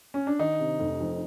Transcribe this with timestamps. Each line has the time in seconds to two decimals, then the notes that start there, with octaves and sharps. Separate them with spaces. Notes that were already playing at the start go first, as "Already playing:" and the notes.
0.14 C#4
0.27 D4
0.39 D#3 D#4
0.60 C3
0.80 F1
1.01 F2